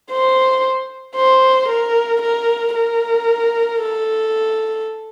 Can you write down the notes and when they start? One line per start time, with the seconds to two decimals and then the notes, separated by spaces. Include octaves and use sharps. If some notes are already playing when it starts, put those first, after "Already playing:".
0.11 C5
1.15 C5
1.69 A#4
2.22 A#4
2.75 A#4
3.81 A4